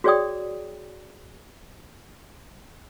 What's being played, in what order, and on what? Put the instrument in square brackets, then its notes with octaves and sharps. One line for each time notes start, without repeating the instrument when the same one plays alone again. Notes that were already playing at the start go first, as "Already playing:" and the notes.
[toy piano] F#4 G#4 C#5 D5 G5 D#6